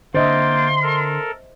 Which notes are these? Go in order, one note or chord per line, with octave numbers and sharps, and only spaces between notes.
D3 A#3 C5 D#5 E5 G5 C6 A6
A4 A#4